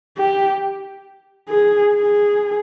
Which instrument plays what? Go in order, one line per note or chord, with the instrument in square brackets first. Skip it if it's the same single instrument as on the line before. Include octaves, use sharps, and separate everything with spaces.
[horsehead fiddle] G4
G#4
G#4